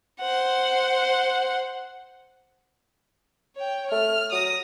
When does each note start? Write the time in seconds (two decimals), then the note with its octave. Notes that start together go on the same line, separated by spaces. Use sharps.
0.21 C5 F#5
3.56 C#5 G5
3.91 A3 F6
4.32 F#3 D#6 A#6